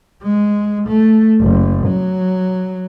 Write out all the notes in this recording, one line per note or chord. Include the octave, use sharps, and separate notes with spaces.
G#3
A3
F#1
F#3